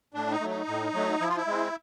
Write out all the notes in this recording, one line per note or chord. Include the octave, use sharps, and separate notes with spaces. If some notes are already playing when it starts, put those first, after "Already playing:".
A2 D4
D#4
F#3 A3
D#4
A2
F#3 A3
F3 E4
F4
E4
G#3 C4